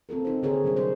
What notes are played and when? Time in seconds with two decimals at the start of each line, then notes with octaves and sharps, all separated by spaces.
0.09 C4 F4 A4 A#4
0.25 D#4 C5
0.43 D3 G#4 A#4 C5 C#5
0.63 C3 F#3 G3 D4
0.77 C5